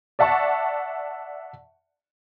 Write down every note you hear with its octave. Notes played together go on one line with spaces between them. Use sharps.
D5 E5 F#5 A5 C#6